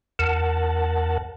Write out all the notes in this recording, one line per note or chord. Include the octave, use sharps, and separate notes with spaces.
E2 A#4 F#5 A5